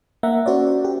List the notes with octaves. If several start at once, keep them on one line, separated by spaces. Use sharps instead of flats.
A#3 E5 F#5 A#5
C#4 F#4 C5 D5
G4